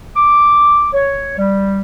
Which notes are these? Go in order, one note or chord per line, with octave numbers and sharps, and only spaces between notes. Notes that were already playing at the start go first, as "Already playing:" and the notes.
D6
C#5
G3